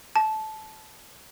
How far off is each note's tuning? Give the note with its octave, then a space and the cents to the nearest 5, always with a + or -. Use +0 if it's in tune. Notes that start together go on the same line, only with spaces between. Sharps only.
A5 -15